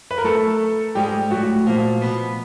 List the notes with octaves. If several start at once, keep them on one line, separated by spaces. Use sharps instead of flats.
B4
A#4
A3 A4
G#2 G3 G#3 G4
A2 F#3 A3 F#4
A#2 F3 A#3 F4
B2 B3